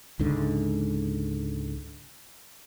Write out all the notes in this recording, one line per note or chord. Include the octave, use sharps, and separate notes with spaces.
C#2 G#2 D3